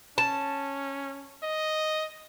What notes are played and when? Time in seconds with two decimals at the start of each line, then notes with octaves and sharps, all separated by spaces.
0.18 C#4 A5
1.43 D#5